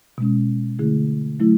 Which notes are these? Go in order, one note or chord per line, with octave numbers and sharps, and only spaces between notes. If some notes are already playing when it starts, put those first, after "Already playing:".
B2 G#3 C#4
D3 A3 E4 G#4
F#3 A3 E4